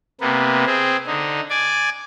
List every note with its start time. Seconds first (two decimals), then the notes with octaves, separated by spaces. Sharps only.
0.21 C3 A#3 B3
0.66 C4 G#4
1.07 D3 D#4
1.50 D5 G#5 D6